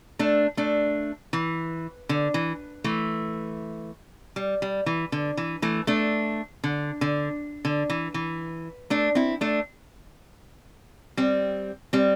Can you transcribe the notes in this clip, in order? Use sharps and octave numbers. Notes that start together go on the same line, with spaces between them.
A3 D4
A3 D4
E3
D3
E3
E3 A3
G3
G3
E3
D3
E3
E3 A3
A3 D4
D3
D3
D3
E3
E3
A3 D4
C4 E4
A3 D4
G3 C4
G3 C4